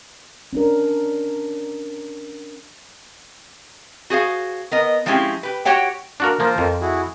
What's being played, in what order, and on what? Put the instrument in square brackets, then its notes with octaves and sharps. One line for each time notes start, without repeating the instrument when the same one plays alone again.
[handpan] C#4 D4 A#4
[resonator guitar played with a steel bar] F#4 G#4 C5 F5
B3 A#4 D#5
F3 G#3 C4 C#4 E4 G4
G4 B4
F#4 G4 C#5 F#5 G5
[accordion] A#3 [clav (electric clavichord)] D4 F#4 A#4
[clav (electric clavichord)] F3 A#3 [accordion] F4 A#4 C5
[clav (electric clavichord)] F2
[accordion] E4 F#4 G#4